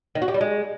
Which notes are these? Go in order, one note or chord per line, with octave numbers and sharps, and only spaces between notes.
D#3
F#4
G4
G3
G#3